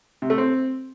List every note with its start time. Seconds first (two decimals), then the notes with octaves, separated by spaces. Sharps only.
0.22 C3
0.30 A3
0.38 C4